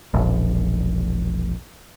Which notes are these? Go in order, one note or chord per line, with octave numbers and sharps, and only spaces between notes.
E1 A#1